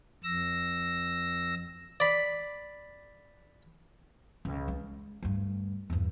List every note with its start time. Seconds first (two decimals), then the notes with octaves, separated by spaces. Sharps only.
0.24 F2 E6 A#6
2.00 D5 B5
4.45 C#2
4.68 G#3
5.23 D2 G2
5.90 E2 G2